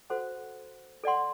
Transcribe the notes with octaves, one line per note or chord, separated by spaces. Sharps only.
F#4 A4 C5 F#5
A4 D5 F#5 C6